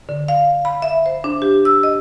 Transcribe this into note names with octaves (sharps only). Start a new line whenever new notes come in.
D3
F5
B5
E5
C5
D4
G4
E6
D#5